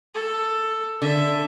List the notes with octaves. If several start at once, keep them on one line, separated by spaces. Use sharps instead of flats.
A4
D3 A4 E5